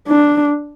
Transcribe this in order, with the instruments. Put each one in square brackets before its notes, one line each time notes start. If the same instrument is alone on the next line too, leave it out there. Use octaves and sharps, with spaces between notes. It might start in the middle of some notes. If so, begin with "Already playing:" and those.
[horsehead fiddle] D4